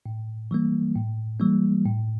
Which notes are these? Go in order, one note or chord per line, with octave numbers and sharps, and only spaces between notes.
A2
E3 G3 A#3
A2
E3 G3 A#3
A2